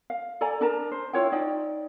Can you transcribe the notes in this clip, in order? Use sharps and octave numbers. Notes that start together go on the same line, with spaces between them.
F5
A4 D5 G#5 A#5
D4 A#4 A5 A#5
C5
E4 F4 C#5 G5
D#4 D5 G5